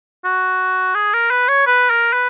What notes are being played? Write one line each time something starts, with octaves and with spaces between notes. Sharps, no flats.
F#4
G#4
A#4
B4
C#5
B4
A#4
B4